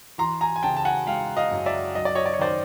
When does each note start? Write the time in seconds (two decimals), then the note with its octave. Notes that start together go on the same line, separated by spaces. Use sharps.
0.18 E3 A#5 C6
0.41 G#5 A#5
0.56 G#5
0.63 C#3 G5 A5
0.77 A5
0.85 F#5 G#5
1.07 G#3 F5 G5
1.37 D#5 F5
1.51 F#2
1.66 D5 E5
1.95 F#3 D#5
2.05 D5
2.15 C#5 D#5
2.26 D5
2.34 C#5
2.39 D#3 C5 D5